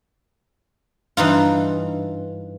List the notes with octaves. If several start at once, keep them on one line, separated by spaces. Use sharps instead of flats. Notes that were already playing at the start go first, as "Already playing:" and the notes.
G2 E3 D#4 F4